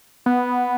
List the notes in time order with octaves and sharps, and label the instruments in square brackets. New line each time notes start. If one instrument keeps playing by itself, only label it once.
[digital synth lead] B3